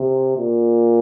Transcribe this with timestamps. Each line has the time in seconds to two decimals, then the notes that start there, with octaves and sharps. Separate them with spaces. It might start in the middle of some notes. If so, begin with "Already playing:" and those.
Already playing: C3
0.37 A#2